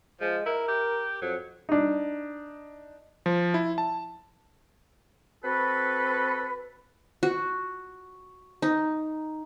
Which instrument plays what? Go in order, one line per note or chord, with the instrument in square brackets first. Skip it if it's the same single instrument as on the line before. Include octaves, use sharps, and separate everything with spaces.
[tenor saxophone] F3 [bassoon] G#3
[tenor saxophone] E4 [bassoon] A#4
[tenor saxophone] G4
[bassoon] F2 [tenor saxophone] F#3
[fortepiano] D4 D#4
[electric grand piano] F3
E4
A5
[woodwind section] C4 F#4 A4 B4
[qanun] F#4
D#4